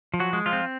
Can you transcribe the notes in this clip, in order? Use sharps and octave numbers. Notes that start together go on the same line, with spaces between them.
F3
F#3 F#4
G#3
F3 F4
C4